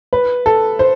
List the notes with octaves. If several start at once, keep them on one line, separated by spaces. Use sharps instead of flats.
B4
A4
C5